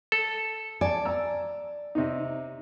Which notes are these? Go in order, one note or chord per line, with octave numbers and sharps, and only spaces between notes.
A4
D5 G#5 A5
A#5 E6
C3 D#4